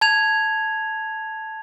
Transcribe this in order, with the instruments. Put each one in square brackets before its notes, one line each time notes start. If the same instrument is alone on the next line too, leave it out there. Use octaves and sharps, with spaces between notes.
[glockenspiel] A5 G#6 F7